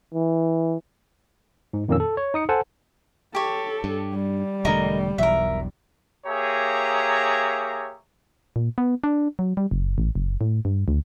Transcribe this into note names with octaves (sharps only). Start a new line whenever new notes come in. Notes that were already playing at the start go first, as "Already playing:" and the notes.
E3
G#2
F2 A#2 D#3 A#3 C#4 E6
A4
C#5
D#4 D#6 C#7
A4 C5 F#5 G#5 A5
G4 A4 C#5
G2
G3
E1 D3 A3 A#4 D#5 A#5
E1 B1 E2 A#4 E5
A#3 G4 G#4 C#5 E5 A#5
A#2
B3
D4
F#3
G3
F#1
A1
F#1
A2
G2
D2